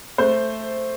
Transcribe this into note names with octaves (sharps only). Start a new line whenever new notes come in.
A3 C5